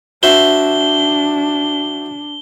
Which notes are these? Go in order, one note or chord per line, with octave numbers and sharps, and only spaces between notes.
D4 F#4 C5 E5 G7